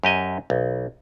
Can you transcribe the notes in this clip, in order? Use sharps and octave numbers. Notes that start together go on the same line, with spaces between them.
F#2 G4 D#5 G#5
B1